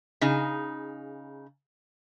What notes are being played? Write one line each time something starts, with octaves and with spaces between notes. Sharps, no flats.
C#3 D#4 G#4